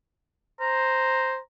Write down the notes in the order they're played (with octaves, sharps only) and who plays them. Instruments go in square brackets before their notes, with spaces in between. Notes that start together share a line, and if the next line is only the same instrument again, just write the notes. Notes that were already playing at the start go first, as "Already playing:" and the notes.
[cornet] C5 [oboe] A#5